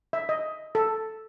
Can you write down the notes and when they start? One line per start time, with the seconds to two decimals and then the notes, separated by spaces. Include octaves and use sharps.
0.13 E5
0.29 D#5
0.75 A4